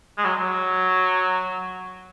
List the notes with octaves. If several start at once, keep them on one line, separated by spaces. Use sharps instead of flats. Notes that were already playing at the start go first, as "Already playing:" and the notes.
G#3
F#3
F#3